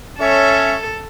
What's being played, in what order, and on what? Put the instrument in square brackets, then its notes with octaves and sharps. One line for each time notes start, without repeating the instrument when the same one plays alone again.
[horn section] C#4 C#5 [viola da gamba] A4 [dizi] E5